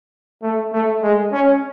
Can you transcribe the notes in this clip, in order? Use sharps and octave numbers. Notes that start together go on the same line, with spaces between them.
A3
A3
G#3
C#4